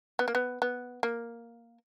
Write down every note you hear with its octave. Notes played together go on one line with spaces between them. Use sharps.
B3
A#3
B3
B3
A#3